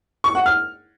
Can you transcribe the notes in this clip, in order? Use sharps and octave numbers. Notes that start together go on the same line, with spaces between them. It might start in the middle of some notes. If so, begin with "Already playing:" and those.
C#6
F#5
F6